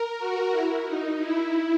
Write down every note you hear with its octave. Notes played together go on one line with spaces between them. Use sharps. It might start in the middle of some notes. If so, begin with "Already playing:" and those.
Already playing: A#4
F#4
E4
D#4
E4